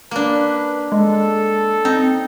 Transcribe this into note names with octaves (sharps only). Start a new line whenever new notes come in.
A#3 D4 B4
G#3 A4
C4 D#4